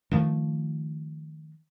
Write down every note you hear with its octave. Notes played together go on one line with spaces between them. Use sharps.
D#3 F3 A3